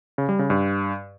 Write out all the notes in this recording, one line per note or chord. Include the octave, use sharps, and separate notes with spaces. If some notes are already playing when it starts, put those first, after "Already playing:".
C#3
G3
C#3
G2